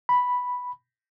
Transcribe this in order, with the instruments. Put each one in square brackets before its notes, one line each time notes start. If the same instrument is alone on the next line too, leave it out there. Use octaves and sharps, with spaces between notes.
[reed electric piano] B5